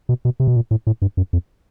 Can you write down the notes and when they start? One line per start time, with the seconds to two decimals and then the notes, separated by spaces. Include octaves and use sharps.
0.09 B2
0.25 B2
0.40 C3
0.48 B2
0.56 A#2
0.71 A2
0.87 A2
1.02 G2
1.17 F#2
1.33 F2